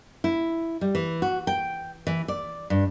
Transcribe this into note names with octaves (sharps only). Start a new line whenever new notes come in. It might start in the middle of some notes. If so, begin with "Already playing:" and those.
E4
G3
E3
F#4
G5
E3
D5
G2